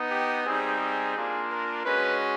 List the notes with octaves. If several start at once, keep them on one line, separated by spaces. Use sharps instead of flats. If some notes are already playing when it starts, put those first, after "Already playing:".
Already playing: B3 D#4
G4
G3 C4 D#4 G#4
G#4
A#3 D4 F4
A#4
G#3 C#4 F#4 B4